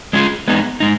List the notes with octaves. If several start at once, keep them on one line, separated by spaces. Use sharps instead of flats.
G#3 C#4 F4 G#4
G#3 B3 D#4
G#3 D#4